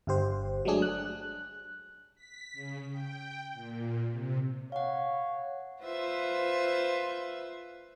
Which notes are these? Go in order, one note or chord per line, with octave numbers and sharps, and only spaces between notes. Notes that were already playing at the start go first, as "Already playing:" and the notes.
G1 G2 G4 C5
F#3 G#3 A3 D4 G#4
F#6
B6
C#3
G5
A#2
C3
C#5 F5 F#5
F4 B4 C5 E5